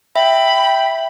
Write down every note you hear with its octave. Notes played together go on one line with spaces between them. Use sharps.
E5 G5 B5